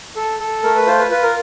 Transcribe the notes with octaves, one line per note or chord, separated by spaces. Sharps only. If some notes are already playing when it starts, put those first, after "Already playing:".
A4
A4
A3 A#4
B4
F4 C5
B4
F4 B4
A#4